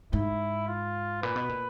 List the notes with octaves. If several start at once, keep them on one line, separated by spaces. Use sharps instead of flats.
G#2 E4
F4
A#2 B4
B2
A#2